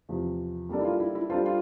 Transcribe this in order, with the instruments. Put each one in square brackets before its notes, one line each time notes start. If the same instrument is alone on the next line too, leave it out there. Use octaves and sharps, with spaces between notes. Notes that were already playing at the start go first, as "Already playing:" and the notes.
[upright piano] E2 C3 F3
G3 A#3 D4 A4 D5
[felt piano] E4
F4
E4
E4
[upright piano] G3 D4 A4 C5 [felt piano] F4
[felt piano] F4